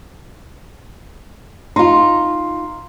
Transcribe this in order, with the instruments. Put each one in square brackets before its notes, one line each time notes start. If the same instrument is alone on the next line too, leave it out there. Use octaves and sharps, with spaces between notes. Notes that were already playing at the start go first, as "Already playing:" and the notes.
[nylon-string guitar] D#4 F4 [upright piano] C6